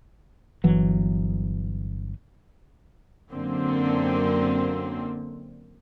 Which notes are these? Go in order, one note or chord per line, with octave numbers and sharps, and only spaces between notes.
G1 E3 F#3
F#2 D3 A#3 C4